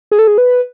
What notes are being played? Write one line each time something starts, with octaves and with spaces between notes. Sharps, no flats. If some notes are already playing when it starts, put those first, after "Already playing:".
G#4
A4
G#4
B4